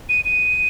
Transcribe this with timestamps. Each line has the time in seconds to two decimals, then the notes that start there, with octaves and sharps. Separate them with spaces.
0.09 D#7
0.25 D#7